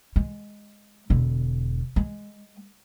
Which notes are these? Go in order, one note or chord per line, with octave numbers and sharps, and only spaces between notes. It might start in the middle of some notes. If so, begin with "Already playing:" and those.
G#3
E1 D3
G#3